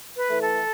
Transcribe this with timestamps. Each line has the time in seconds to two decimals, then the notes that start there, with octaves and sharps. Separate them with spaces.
0.17 B4
0.29 E3 A3
0.42 A4